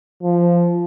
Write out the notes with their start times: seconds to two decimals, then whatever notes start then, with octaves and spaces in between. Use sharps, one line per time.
0.23 F3